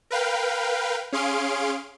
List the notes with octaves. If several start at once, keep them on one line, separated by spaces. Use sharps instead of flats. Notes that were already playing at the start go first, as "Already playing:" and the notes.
A#4 B4 F5 G5
C#4 G#4 F5 C6 D7